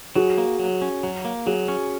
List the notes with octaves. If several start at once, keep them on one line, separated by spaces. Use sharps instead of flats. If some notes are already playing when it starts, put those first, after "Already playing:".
F#3 F#4 G#4
A#3
F#3
C#4
F#3
A#3
F#3 F#4 G#4
C#4